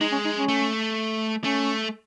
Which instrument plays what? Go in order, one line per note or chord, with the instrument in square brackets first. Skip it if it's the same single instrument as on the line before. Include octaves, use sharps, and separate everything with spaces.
[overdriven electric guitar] G#3 [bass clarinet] D#4
[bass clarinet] C#4
D#4
C#4
[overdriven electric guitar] A3
[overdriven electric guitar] A3 [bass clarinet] C#4